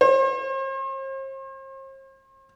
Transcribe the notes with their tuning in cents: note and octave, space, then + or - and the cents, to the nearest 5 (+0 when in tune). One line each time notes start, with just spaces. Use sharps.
C5 +45